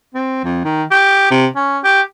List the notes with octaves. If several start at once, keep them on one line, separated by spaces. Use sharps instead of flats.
C4
F2
D#3
G4
C3
C#4
G4